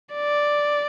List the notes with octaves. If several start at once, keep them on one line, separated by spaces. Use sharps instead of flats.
D5